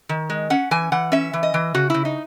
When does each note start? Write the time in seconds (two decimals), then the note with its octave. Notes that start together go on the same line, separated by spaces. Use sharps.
0.09 D#3
0.30 G#3
0.50 C#4 F#5
0.71 E3 G#5
0.92 E3 F#5
1.12 C#4 E5
1.33 E3
1.43 D#5
1.54 E3
1.75 C#3 F#4
1.90 C#3 E4
2.05 D#4